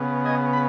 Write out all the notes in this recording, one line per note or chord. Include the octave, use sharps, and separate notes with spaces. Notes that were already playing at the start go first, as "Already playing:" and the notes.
Already playing: C#3 B3
D#5 G#5
B5